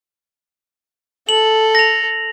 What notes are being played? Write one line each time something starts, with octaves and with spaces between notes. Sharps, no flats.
A4 F#7
A#6 F7